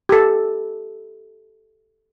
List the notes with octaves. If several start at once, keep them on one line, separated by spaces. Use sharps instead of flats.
G4 A4